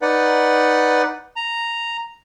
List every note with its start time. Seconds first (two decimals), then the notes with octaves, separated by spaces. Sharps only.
0.02 D#4 B4 D5 F#5
1.36 A#5